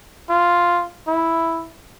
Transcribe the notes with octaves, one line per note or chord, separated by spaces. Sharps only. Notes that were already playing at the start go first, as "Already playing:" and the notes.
F4
E4